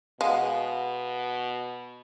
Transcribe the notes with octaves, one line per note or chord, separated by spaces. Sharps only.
B2 G#3 F5 F#5